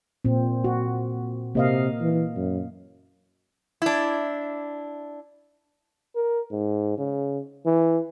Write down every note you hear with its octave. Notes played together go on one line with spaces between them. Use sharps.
A#2 C4
F#4
C3 A#3 D#5 F5
E3
F#2
D4 E4
A#4
G#2
C#3
E3